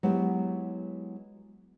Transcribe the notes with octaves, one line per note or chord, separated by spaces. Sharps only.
F#3 G#3 B3 E4 G4